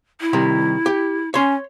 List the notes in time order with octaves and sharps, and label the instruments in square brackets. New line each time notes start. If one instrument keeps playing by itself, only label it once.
[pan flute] E4
[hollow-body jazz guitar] C3 D#3 G3
G4
[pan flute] C#4 [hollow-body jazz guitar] C#5 C6